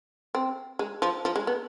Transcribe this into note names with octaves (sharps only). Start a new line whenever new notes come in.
C4
G#3
F3
F3
G#3
B3